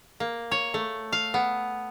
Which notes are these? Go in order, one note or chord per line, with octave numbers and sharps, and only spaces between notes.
A#3
C#5
A3
F5
B3